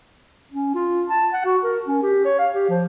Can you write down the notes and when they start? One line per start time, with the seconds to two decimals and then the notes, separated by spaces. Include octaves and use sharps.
0.52 C#4
0.75 F4
1.09 A5
1.33 F#5
1.45 F#4
1.64 A#4
1.88 C#4
2.03 G4
2.25 C#5
2.39 F5
2.54 G4
2.70 F3